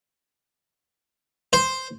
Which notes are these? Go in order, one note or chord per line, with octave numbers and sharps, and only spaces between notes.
C5